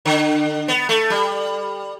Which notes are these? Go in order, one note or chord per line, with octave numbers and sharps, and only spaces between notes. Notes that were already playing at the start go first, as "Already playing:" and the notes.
D3
B3
A3
G3